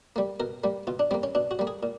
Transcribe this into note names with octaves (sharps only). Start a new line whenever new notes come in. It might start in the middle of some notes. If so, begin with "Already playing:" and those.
G3 A#3
B2 A#4
G3 A#3
B2 F4
D4
G3 A#3 C4
C#4
B2 D4
F#4
G3 A#3
G#4
A#2